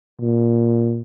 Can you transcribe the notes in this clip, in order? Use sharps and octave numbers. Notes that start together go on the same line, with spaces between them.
A#2